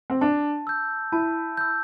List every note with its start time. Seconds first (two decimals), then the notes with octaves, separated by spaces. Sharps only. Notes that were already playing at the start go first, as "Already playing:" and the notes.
0.10 C4
0.21 D4 A5
0.67 E6 G6
1.12 E4 A5
1.57 E6 G6